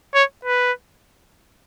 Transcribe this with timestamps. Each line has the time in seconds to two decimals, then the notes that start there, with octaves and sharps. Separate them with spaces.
0.15 C#5
0.45 B4